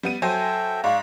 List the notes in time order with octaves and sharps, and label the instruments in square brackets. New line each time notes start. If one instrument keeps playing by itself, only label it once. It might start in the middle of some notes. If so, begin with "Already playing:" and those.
[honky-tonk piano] G3 B3 D#7
[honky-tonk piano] F#3 C5 G#5 [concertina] A4 E5 G5
[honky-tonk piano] G#2 [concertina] D5 C#6 [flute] F5